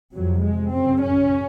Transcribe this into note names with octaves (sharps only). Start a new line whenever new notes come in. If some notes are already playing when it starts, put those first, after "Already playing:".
F2 C3 F#3
G#3
F#2 C#3 C4
C#4